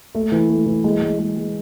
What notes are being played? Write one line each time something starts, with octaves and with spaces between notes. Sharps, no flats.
A3
E3
A3
E3
G#3
G#3
G#3
G#3